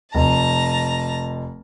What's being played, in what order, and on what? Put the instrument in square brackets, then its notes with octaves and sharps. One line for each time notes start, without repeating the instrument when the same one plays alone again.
[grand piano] F1 [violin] A5 A#5